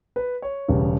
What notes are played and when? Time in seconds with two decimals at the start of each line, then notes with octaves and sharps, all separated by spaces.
0.16 B4
0.42 C#5
0.68 E1 E2 C#3 G3 B3